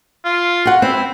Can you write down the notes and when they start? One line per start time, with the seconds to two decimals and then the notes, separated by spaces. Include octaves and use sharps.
0.25 F4
0.65 F#4 F#5
0.82 C4 E4